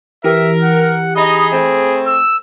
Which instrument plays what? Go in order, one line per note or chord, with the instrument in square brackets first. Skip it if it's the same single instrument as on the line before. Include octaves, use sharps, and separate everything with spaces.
[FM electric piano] E3 G4 [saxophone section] A#4 [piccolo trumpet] E5
[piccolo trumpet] F#5
[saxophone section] D#4 D#5 [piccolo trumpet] G#4 [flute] B5
[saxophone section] A3 C4
[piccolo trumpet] E6